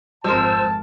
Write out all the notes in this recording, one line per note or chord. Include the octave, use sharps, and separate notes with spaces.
G#1 F2 G#3 A#4 C5 A5 E6